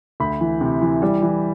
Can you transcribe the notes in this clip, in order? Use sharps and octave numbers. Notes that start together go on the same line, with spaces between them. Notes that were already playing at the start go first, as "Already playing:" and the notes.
D2 B5
E3
C3
E3
G3
E3